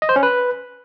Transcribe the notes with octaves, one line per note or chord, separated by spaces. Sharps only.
D#5
C5
C#4
B4